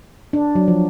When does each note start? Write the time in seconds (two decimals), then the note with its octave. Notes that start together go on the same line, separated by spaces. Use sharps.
0.33 D4
0.55 F#3
0.68 F3